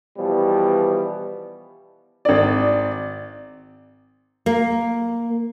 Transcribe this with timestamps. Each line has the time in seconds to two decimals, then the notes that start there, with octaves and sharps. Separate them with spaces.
0.16 B2 E3 F3 G3
2.25 G#1 D5
4.46 A#3